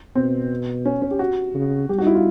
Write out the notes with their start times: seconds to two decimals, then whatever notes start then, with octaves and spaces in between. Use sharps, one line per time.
0.15 B2 C4
0.85 C#4
1.02 C#4
1.11 G4
1.19 F#4
1.55 C#3
1.89 G3 G4
1.98 F#4
2.02 D#4
2.07 E4
2.15 F4